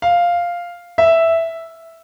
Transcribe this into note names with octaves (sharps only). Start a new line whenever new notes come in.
F5
E5